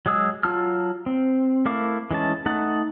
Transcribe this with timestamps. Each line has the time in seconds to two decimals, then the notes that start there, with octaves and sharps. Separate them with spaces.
0.06 F#3 G#3 G#4 E6
0.43 F#3 F4 A5 E6 F6
1.06 C4
1.65 A3 E4 A#4 F5 D6
2.11 E3 G#3 C#4 A5
2.46 A3 D#4 F#5 A5